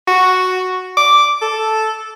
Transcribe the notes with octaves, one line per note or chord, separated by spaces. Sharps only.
F#4
D6
A4